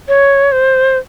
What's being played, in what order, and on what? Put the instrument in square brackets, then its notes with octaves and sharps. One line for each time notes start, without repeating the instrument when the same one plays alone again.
[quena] C#5
C5